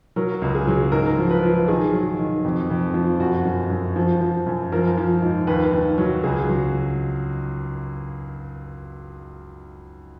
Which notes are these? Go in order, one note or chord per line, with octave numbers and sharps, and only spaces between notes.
F#3 A#4
C#2
G#4
F#3
G#2 A#4
F3
B4
F3
D#3 G#4
F#3
D#3
F2
F2
F3
F#2 F#4
F#2
F#2
F3
F3
F#2
F3 A#4
F3
G#2
D#2 B4
D#2
F#3
C#2 G#4
F#3